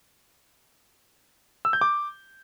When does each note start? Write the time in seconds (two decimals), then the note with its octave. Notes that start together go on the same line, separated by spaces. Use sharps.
1.65 E6
1.73 G6
1.81 D6